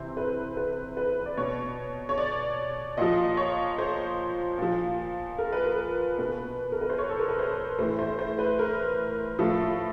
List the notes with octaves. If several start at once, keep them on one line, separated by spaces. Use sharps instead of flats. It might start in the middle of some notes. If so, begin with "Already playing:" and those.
Already playing: C3 E3 C5
B4
B4
B4
D5
B2 C#5
C#5
D5
A#2 F3 D#5
C#5
C5
A#2 F3
A#4
B4
A#4
B2 B4
A#4
B4
C5
C#5
A4
A#4
B4
C5
A2 E3 C5
C5
C5
B4
A#4
A2 F3 A4